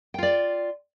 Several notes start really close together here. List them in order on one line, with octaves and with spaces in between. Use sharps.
G5 F4 D5